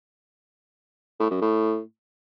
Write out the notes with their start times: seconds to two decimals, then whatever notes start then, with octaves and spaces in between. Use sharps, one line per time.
1.20 A2
1.31 F#2
1.41 A2